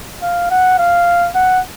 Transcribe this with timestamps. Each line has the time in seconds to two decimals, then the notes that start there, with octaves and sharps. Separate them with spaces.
0.22 F5
0.51 F#5
0.79 F5
1.35 F#5